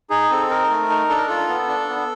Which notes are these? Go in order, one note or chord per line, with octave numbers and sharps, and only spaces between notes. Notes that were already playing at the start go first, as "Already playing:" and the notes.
D#4 G#4
C4 A4
D#4 A#4
A3
D#4
D4 A4
A#4
F4 A4
B3
D4
B3